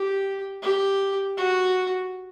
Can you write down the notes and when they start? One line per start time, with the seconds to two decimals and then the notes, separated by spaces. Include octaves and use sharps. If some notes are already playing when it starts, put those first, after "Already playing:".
Already playing: G4
0.62 G4
1.37 F#4